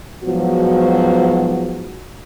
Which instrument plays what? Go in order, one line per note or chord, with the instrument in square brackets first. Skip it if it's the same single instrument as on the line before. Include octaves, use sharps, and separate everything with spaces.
[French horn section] G#2 F3 F#3 B3 F#4